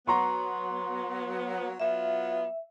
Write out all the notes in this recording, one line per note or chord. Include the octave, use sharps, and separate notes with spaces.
F#3 B3 A#5 C6 C#6
F#3 B3 F4 E5